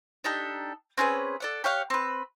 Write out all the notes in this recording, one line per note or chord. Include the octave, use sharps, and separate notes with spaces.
D4 D#4 G4 A4
C4 C#4 G#4 B4
A4 D5 F#5
G4 C#5 F5 F#5
C4 B4